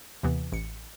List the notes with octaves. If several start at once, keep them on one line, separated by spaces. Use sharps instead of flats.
D#2 C3 E3 B3
A1 C#7